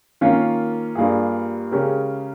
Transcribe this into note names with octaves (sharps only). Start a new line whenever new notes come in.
D#3 A#3 C#4 F4
G2 G3 A#3 F4 G#4
C#3 G#3 C#4 G4 A#4